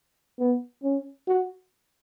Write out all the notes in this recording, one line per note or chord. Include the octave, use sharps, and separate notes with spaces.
B3
C#4
F#4